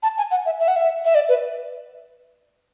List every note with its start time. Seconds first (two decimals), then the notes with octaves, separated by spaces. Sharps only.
0.03 A5
0.18 G#5
0.31 F#5
0.46 E5
0.60 E5
0.68 F#5
0.76 E5
1.05 E5
1.15 D5
1.29 B4